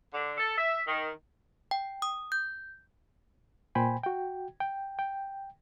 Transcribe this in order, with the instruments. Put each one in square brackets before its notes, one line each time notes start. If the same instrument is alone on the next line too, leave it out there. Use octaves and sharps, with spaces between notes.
[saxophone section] D3
A4
E5
D#3
[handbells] G5
D#6
G6
[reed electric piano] A#2 C5 G5 G#5 B5
F#4 G5
G5
G5